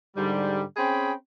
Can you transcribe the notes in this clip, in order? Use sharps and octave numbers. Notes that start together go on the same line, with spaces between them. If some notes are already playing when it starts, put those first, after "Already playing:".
G#2 D3 G3
C4 C#4 G#4 G5 B5